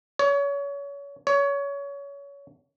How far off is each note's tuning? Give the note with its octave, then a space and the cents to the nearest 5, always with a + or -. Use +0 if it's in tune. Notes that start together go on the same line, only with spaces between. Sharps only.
C#5 +30
C#5 +25